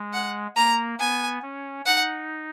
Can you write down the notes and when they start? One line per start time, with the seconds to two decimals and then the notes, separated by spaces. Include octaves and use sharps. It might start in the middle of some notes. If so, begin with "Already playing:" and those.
Already playing: G#3
0.13 F#5
0.56 A#3 A#5
0.99 B3 G#5
1.42 C#4
1.86 D#4 F#5